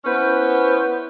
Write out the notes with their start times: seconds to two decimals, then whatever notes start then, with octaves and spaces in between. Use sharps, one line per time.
0.05 B3 C#4 E4 B4 C5